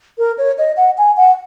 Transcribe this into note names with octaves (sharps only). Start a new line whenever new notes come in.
A#4
C#5
D#5
F#5
G#5
F#5